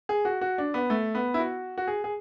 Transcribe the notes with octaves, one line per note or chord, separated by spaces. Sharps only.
G#4
F#4
F#4
D4
B3
A3
B3
E4
F#4
F#4
G#4
G#4